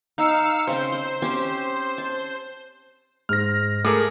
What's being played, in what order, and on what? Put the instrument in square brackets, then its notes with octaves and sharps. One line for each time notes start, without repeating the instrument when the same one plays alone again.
[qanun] D#4 [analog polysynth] F5 E6 C#7
[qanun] C#3 C4 [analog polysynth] C5
[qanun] C6
C4 C#4 G4
A5
[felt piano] G#2 [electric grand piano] F6 A#6
[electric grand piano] A3 G#4 A#4 [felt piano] D6